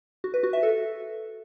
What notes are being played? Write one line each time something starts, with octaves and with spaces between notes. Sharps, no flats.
F#4
B4
F#4
E5
A4